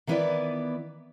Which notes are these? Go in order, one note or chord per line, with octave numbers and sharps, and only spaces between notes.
D#3 E3 B3 E4 B4 D5